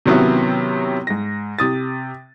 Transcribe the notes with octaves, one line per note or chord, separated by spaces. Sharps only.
C3 D#3 F#3 B3 C#4 E4
G#2 A#6
C3 D#6 A6